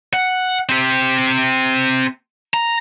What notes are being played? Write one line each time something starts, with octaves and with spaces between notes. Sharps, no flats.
F#5
C4 G4
A#5